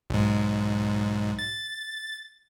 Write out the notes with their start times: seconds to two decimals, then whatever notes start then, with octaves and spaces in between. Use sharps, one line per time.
0.10 B1 G#2
1.39 A6